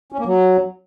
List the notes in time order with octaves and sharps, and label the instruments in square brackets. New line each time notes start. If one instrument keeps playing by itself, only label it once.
[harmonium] C#4
A#3
F#3